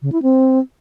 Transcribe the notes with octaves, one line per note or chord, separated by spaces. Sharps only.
C#3
E4
C4